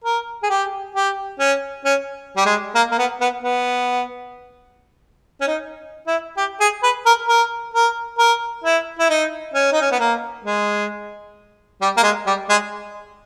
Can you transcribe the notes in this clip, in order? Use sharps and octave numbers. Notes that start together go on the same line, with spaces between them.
A#4
G#4
G4
G4
C#4
C#4
G3
G#3
A#3
A#3
B3
B3
B3
C#4
D#4
E4
G4
G#4
B4
A#4
A#4
A#4
A#4
E4
E4
D#4
C#4
D#4
C#4
B3
A#3
G#3
G3
A#3
G#3
G3
G#3